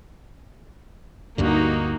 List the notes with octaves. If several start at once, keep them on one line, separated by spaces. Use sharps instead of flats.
D2 G2 D3 A#3 D#4 F#4 G4